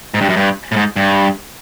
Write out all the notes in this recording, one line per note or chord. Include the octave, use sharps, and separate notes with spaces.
G#2
G2
F#2
G2
A2
G#2
G2